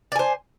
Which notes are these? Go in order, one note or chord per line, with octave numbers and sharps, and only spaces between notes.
C5 D5 G#5